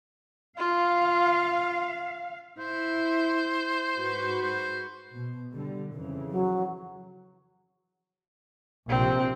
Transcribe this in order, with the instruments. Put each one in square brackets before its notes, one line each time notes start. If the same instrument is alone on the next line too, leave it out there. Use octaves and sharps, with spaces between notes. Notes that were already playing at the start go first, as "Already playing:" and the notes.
[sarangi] F4 [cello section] F5
[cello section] E4 [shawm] C5
[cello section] G#2 F#4 B4
[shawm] C5
[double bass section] B2
D3 G3
F2 C#3 E3
[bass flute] F#3
[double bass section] A#1 C3 F3 [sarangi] C4